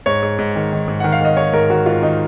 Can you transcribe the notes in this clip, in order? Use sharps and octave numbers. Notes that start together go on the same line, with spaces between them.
G#2 C#5
G#2
G#2
D#3
D#3
G#2
D#3 F#5
F5
D#3 D#5
D#3 C#5
G#2 A#4
D#3 F#4
G#2 F4
D#3 D#4